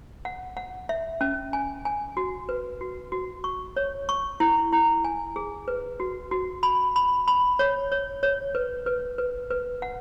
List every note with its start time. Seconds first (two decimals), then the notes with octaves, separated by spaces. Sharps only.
0.25 F#5
0.57 F#5
0.89 E5
1.21 C#4
1.53 G#5
1.85 G#5
2.17 F#4
2.49 B4
2.81 F#4
3.12 F#4
3.44 C#6
3.76 C#5
4.09 C#6
4.40 E4
4.72 E4
5.05 G#5
5.36 G#4
5.68 B4
6.00 F#4
6.31 F#4
6.63 B5
6.96 B5
7.28 B5
7.59 C#5
7.92 C#5
8.23 C#5
8.55 B4
8.86 B4
9.18 B4
9.51 B4
9.82 F#5